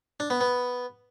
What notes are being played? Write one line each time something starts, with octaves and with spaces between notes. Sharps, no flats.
D4
B3
B3